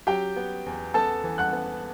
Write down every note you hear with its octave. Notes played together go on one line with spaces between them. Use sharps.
F#3 G4 G5
B3
E2
B3 A4 A5
E3
F#5 F#6
B3